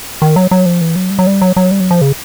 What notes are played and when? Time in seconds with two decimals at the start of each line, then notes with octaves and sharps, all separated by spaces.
0.22 D#3
0.36 F#3
0.51 F#3
0.66 F3
0.81 E3
0.96 F#3
1.10 G3
1.19 F#3
1.27 G3
1.42 F#3
1.56 F#3
1.71 G3
1.80 F#3
1.91 F3
2.01 C#3